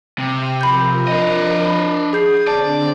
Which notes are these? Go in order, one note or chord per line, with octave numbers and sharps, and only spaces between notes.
C3 E5 F6
F3 A#4 B5 G6
D4 D#5
B5
G#4 D#6 G6 G#6 C7
D3 C4 D4 D5 A5